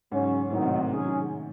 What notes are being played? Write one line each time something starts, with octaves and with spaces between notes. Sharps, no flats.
G#2 C#3 F#3 C#4
A2 D#3 F#3 C4 D#4
C3
C3
D#3 F#3 C#4 G#4
D#3